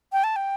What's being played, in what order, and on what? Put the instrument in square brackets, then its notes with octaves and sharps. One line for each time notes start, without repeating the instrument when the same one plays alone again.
[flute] G5
A5
G5